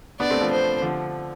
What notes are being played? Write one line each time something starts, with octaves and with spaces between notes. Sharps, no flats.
B3 D4 D5
A3 C4
F3 A3
C5
D3 F3